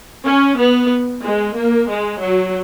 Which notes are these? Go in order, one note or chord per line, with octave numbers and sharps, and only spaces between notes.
C#4
B3
G#3
A#3
G#3
F#3